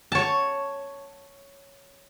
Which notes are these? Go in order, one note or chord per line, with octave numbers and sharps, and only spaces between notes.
C#5 A5